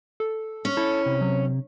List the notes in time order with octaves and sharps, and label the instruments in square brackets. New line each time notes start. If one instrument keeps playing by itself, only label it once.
[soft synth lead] A4
[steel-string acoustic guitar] C#4
[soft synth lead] E4 [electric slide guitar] A4
[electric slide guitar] C3
[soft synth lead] F#3